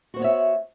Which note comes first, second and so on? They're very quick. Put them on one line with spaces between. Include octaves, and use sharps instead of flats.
F#4 C5 B3 C#5 E5